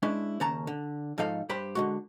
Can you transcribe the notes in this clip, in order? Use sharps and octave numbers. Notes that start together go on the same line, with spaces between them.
G#3 C#4 D4 E4 B4
D#2 C#3 C#4 A5 A#5
D3
G#2 F3 D#4 A4 F5
G2 G4 B4 C5 B5
D3 G#3 F#4